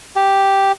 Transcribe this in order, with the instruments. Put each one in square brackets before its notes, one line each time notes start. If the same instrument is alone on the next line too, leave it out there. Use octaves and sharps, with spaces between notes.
[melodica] G4